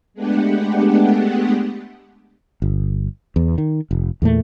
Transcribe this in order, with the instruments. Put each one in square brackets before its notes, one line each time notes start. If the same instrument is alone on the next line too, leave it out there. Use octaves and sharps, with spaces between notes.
[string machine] G#3 A3 B3 D4 G4 F#5
[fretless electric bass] G1
E2
D#3
F1
E2 A#2 A3